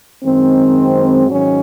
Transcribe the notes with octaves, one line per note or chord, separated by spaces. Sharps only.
F#2 D#3 G#3 C4
G#2 D#3 F#3 C#4